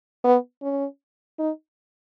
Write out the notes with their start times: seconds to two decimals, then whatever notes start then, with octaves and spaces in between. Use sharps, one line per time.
0.24 B3
0.62 C#4
1.39 D#4